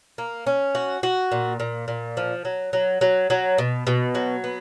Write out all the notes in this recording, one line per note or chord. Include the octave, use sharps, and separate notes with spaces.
A#3
C#4
F#4
F#4
A#2
A#2
A#2
F3
F#3
F#3
F#3
F#3
B2
B2
F#3
B3